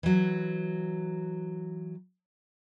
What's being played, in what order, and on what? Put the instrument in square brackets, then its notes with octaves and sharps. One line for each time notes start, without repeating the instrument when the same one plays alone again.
[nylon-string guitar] E3 F#3